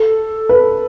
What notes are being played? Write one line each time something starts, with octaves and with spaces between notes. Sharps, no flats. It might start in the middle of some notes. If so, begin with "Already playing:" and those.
Already playing: A4
B4